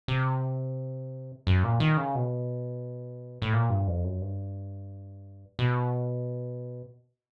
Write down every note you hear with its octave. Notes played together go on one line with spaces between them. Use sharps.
C3
F#2
A#2
D#3
C#3
B2
A2
A#2
G2
F2
F#2
G2
B2